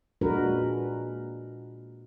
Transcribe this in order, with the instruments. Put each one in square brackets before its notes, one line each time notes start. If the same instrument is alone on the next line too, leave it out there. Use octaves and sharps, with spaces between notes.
[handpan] A#2 G#3 D4 F#4 A#4 B4